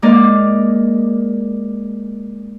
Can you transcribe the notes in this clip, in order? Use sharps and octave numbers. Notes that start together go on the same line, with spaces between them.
G#3 A#3 D#4 A#4 D5 D#5